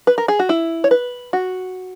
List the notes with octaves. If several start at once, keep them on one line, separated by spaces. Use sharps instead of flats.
B4
A#4
G#4
F#4
E4
C#5
B4
F#4